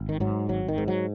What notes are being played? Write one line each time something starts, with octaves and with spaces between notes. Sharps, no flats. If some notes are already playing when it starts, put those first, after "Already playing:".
Already playing: G#1
D#3
G#2 F#3
G#1 F#3
D#3
G#2
F#3